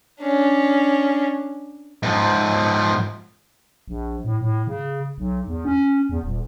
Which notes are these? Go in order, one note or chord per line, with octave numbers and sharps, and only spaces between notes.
C#4 D4
G#2 F3
A#1
A2
A2
C#3
B1
E2
C#4
E2
D#1